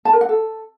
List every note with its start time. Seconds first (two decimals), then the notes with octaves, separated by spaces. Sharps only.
0.05 A5
0.13 A#4
0.21 F#5
0.29 A4